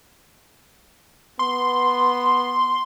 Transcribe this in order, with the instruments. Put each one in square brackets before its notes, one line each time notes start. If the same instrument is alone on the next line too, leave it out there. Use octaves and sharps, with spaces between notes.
[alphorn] B3 [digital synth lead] C6